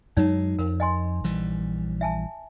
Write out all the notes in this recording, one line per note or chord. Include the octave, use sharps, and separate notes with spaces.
F#2 F#3 G#3 D#4 C#5
F2 A#4
D#5 G#5 C6
A#1 E3 G3
E5 G#5 A5